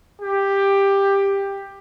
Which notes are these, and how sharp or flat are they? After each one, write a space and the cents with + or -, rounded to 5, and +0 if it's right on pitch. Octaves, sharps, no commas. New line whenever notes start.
G4 +10